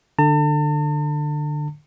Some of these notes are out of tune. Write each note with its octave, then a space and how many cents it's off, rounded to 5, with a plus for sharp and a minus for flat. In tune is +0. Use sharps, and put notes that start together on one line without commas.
D3 +20 A5 +40